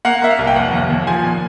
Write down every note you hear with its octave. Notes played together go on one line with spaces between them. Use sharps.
A#3 F#5
A#3 E5
F5
C2
G5
F1 F#5
D#2
D#2
F3 G#5
A#2